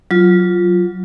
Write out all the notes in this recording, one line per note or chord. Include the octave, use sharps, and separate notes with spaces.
F#3 F4